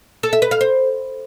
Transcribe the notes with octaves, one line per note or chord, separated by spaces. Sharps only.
A4
E5
B4
F5
C5